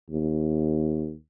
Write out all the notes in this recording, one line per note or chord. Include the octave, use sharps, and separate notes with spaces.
D#2